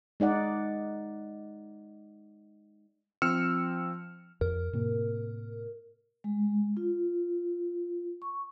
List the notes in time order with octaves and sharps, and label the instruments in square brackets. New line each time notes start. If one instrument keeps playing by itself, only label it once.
[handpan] G#3 D#4 D5 F#5
[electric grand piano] F3 C4 E6 F6 C#7 E7
[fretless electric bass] F2 [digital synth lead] A#4
[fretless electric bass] A2 C3 A#3
[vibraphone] G#3
F4
C#6